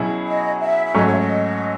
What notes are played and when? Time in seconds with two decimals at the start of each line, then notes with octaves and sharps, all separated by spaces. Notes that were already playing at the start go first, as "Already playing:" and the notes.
Already playing: B2 F#3 C#4 E4 G#4
0.27 D#5
0.61 E5
0.85 E5
0.94 G#2 F#3 A3 C#4 D#5
1.06 C#5
1.13 E5
1.18 D#5